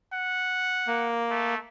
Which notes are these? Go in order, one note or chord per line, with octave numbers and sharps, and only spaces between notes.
F#5
A#3
A3